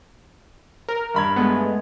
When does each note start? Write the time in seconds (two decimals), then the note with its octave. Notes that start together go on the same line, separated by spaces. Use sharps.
0.89 A#4
1.14 G2 B5 G#6
1.36 G#3 A3 B3